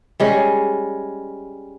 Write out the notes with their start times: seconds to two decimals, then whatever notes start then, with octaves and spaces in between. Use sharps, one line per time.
0.20 G3 G#3 C#4